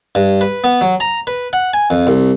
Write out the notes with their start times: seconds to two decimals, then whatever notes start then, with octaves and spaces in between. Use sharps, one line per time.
0.15 G2
0.41 B4
0.64 B3
0.81 F#3
1.00 A#5
1.27 B4
1.53 F#5
1.74 G#5
1.90 F2
2.07 C2